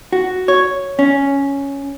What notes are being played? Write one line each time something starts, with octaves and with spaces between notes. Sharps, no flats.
F#4
C#5
C#4